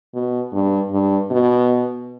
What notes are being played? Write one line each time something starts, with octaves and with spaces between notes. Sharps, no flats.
B2
G2
G2
B2